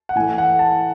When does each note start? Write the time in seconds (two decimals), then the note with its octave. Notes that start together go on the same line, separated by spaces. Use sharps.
0.09 F#5
0.15 A2 E3 A3 G#5
0.38 F#5
0.59 A5